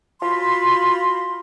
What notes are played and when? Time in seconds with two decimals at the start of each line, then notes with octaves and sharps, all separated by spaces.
0.21 F4 F#4 B5 C6